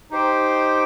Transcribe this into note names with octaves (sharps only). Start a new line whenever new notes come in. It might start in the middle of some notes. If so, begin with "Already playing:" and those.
D#4 G4 C5 G5